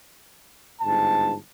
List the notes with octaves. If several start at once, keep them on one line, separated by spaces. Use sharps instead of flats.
G1 G#2 A5